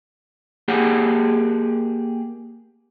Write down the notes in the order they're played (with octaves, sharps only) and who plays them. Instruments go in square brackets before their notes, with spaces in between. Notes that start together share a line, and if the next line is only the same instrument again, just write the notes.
[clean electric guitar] A#3 G4 G#4 F#5